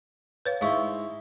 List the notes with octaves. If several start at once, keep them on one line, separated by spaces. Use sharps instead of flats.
B4 C#5 F5
G#2 E4 F5 C6 C#6